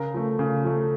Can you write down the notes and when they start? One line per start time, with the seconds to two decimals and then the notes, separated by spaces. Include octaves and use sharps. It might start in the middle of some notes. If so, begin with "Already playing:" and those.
Already playing: C#3 A#4
0.14 F3 A3
0.39 C#3
0.64 F3 A3